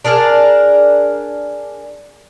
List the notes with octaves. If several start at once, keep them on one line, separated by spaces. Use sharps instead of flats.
D4 G#4 A#4 D5